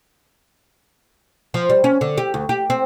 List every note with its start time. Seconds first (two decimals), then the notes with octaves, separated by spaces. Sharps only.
1.54 F3
1.70 G3
1.84 C#4
2.01 D3
2.18 G4
2.34 D2
2.49 G4
2.70 C4